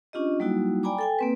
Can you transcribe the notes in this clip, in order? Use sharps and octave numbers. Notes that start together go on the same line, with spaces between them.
C#4 D4 F4 G4 D#5
F#3 G3 A#3 D#4 E4 F#4
D5 G5 G#5 A#5 B5 D6
A4 G5 G#5
A#3 C4 B4